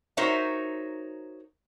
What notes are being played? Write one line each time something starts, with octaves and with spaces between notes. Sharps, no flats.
D#4 F#4 A#4 C5 C#5 E5